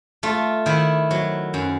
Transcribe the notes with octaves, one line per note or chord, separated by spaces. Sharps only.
A3 F4
D#3 E4
F#3
F#2